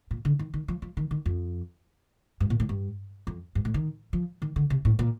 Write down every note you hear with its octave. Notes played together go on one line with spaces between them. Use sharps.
A#2
D3
D#3
D#3
F3
F3
D#3
D#3
F2
G2
A#2
A2
G2
F2
G2
A2
D#3
F3
D#3
D3
C3
A2
A#2